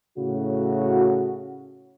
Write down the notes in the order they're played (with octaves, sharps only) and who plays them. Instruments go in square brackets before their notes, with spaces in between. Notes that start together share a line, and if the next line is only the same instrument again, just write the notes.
[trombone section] A2 C#3 F#4